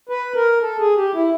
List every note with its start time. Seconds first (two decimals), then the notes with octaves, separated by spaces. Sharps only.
0.09 B4
0.35 A#4
0.62 A4
0.79 G#4
0.97 G4
1.14 E4